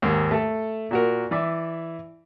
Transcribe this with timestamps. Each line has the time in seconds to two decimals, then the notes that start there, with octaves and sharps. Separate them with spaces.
0.02 D#2 G#2 A#3
0.31 A3 A4
0.91 A#2 F#4 A#4
1.31 E3 D5 E5